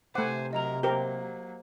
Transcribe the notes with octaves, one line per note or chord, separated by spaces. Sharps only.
C3 A3 C5 F#5 G#5 D6
F#3 A#4 D#5 A#5 F7
F#3 A#3 G4 A#4 C5 G7